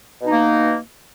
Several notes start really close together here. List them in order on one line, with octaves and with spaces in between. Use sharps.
B2 D#4 A#3